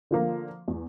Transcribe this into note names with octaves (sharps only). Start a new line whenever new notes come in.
D3 F3 A#3
E2